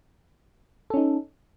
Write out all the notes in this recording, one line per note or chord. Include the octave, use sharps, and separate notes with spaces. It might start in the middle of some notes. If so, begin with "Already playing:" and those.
C#4 D#4 A4